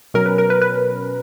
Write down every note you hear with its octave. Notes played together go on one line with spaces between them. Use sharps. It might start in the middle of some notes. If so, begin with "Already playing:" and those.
B2 F#3 C#4 A#4
B4
A#4
B4
B4